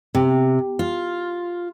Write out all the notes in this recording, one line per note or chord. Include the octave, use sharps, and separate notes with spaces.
C3
F4